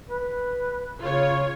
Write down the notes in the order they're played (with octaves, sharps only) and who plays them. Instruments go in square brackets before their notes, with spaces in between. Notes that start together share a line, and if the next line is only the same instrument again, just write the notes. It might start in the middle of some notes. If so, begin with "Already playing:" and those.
[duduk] B4
[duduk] C#3 [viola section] F4 C#5